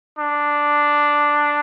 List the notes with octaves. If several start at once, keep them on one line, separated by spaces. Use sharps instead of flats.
D4